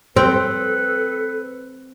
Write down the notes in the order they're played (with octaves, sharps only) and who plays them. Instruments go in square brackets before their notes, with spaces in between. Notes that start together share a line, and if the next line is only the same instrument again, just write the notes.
[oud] C4 [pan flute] A4 [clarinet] B4